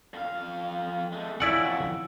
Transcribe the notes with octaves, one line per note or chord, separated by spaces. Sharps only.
F2 F5
G#3 A3
F2 F#3 E4 D5 F#5 G#5 E6